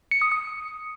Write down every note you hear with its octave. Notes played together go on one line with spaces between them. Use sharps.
C#7
D#6
D#6